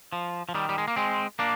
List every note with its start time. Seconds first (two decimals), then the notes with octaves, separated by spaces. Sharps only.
0.13 F3
0.49 F3
0.55 D#3 G3
0.69 G3
0.78 G#3
0.88 A#3
0.96 G#3 C4
1.39 A#3 D4